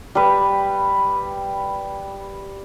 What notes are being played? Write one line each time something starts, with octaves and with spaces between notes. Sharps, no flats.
G3 B4